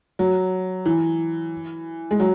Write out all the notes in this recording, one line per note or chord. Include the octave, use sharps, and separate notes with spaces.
F#3
E3
G#3
F#3